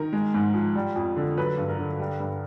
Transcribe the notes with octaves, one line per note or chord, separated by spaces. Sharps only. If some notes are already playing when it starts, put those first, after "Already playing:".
Already playing: D#3 A#4
G#3
G#2
F3
G3
F2
D3
F#3 B4
G2
A#4
D3
G3
G2